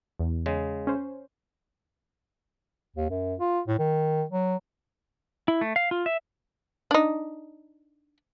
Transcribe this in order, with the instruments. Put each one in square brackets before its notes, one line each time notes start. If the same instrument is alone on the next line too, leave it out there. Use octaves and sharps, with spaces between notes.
[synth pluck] E2
[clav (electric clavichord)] C#3 G#3
[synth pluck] C#4 C5
[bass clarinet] D#2
F#2
F4
A2
D#3
F#3
[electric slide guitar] E4
A3
F5
F4
E5
[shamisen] D4 D#4